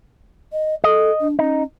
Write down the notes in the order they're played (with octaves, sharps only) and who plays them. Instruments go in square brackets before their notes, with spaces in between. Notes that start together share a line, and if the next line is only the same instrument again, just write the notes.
[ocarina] D#5
[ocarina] A4 [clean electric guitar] D#5
[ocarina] D4
[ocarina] C#4 [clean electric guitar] D#4